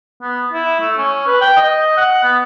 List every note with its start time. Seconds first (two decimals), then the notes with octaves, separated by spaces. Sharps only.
0.22 B3
0.53 E4
0.80 A3
0.98 C#4
1.27 B4
1.41 G5
1.56 D#5
1.97 F#5
2.23 B3